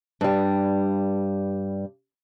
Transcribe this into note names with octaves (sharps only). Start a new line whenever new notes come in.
G2 G3